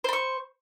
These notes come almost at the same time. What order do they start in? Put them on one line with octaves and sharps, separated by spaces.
C5 B5 C#6